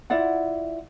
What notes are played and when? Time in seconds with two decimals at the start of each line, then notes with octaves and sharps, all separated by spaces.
0.10 E4 F4 D5 F#5